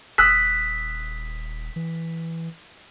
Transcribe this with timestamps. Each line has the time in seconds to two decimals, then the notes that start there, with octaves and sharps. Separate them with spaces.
0.18 D#1 D#6 E6 F#6 B6
1.76 E3